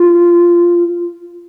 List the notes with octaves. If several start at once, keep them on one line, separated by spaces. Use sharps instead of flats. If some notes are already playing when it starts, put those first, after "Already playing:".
Already playing: F4